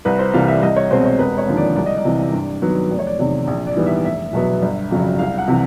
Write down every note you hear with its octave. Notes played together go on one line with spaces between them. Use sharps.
C2 B4
C5
C3 E3 G3 A#3 F5
E5
C2 D#5
C#5
B2 G#3 C4 C5
C#5
E1 B4
C#5
D#2 D3 F3 A#3
D5
C2 D5
D#5
D5
C3 E3
G2
D#3 F#3 B3
F1 D5
C#5
D5
E2 C3 D#3 D5
A#1
D5
G#2 E3 G3 B3
E5
F1 E5
E2 B2 F#3 B3
G1
F2 C#3 F#3
C2 F5
F#5
C3 E3